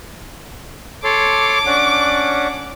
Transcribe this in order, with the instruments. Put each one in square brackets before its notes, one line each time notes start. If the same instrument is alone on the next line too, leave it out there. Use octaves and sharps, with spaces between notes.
[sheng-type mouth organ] A4 C#5 C6 [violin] D6
[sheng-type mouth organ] C#4 D4 F#5